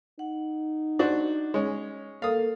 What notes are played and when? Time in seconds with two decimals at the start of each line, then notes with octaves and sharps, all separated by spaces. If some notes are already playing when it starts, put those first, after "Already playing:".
0.19 D#4 F#5
0.99 D4 F#4 C5
1.54 G#3 C#4
2.22 A#3 A4 F5 D#6